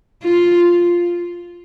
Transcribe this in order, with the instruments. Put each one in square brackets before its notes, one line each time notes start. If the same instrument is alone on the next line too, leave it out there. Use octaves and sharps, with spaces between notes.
[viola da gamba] F4